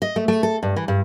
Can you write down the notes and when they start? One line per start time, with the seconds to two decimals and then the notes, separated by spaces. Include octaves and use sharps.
0.02 D#5
0.16 A3
0.28 A3
0.43 A4
0.63 G2
0.76 E3
0.88 G2